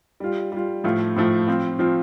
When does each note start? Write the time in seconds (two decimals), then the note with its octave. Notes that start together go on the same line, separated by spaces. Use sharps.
0.20 G3 F4
0.52 G3 F4
0.84 A2 F3 A3 F4
1.16 A2 F3 A3 F4
1.48 F3 C4 F4
1.79 F3 C4 F4